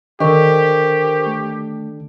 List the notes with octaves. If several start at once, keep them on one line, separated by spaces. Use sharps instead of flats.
D3 D#3 D4 G4 A#4 C5 C#6
A3